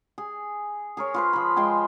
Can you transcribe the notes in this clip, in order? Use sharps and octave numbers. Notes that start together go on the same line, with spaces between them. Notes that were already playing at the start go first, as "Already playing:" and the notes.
G#4
G#4 A#4 C#5
F4 B4 C5
F3 B5
G#3 F4 G5 G#5